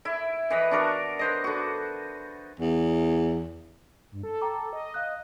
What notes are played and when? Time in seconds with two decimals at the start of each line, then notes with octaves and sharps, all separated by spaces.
0.05 E4 E5
0.50 E3 B4 D#5
0.71 D4 F#4 A#4
1.19 B4 C5 D#5
1.44 D3 F#4
2.60 E2
4.11 G2
4.23 A4
4.41 G5 A#5 D6
4.73 D#5
4.94 F5 F#6